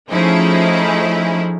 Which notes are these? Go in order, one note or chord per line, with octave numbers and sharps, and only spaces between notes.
F3 A3 C#4 D#4 E4 G#4